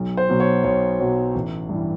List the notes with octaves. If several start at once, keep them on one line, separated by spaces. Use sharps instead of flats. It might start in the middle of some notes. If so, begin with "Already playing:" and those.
Already playing: B1
C5
B2 F#3
C#5
B1 C#5
B2 F#3
A1
G2 E3